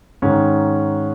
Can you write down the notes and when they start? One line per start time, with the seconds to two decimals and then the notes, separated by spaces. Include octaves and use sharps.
0.22 G#2 D#3 C#4